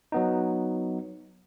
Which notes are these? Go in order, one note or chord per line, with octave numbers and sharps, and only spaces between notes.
F#3 B3 D#4